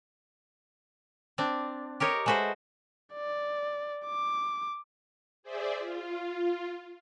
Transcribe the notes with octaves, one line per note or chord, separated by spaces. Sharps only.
C4 D4
G4 A#4 C#5 D#5
G#3 A3 F#4 B4 C5
D5
D6
G#4 C5 D5 E5
F4